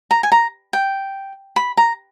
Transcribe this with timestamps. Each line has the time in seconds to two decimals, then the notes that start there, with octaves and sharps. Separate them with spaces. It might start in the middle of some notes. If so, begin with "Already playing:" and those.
0.11 A#5
0.23 G#5
0.32 A#5
0.73 G5
1.56 B5
1.77 A#5